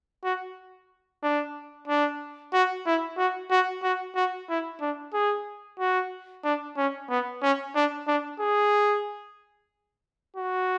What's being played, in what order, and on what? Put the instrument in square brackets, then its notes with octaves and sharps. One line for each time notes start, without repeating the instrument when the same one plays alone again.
[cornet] F#4
D4
D4
F#4
E4
F#4
F#4
F#4
F#4
E4
D4
G#4
F#4
D4
C#4
B3
C#4
D4
D4
G#4
F#4